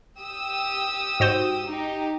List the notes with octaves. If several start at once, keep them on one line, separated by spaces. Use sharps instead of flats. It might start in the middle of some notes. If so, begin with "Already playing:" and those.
G4 D#6 E6
G#2 F#4 C5
D#4 G4